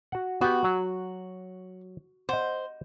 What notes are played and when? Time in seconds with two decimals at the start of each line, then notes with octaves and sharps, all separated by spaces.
0.12 F#4 F#5
0.41 B3 F#4 G4
0.64 F#3
2.29 C5 D#5 F#5